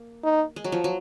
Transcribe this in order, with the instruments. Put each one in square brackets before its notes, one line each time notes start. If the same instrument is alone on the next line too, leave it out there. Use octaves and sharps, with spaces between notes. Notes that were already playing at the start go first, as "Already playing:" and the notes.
Already playing: [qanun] A#3
[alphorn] D#4
[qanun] G#3
F#3
F3
F#3